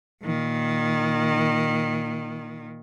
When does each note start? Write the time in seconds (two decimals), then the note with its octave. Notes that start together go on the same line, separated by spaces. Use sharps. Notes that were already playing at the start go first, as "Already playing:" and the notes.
0.23 A#2 D#3